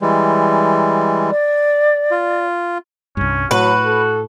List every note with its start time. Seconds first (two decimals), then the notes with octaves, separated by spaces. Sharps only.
0.02 E3 G3 G#3
1.30 D5
2.11 F4
3.17 C2 G2 C#4
3.51 A2 F#3 F#4 B4
3.86 A4